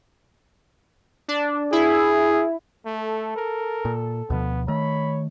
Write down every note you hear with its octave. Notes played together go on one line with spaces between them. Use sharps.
D4
E4 G#4
A3 A4
A#4
A#2
D2 B2 F3 B3
D#3 A3 C#5 B5